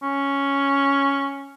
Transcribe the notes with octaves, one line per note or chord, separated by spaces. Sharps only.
C#4